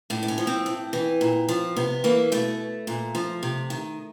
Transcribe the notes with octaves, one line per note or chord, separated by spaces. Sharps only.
A2 D4
D4
C#4
F3
C4
A2
E3
A#2
F3
C3 B3
E3 A#3
B2 A3
A#2
F3
C3
D#3